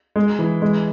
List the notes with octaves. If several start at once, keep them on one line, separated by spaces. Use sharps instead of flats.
G#3
E3
G#3